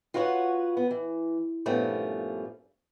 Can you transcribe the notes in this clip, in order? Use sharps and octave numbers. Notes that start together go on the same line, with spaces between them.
F4 F#4 B4 C#5 D5 F#5
B3
E3
G2 A#2 F3 A3 B3 C#4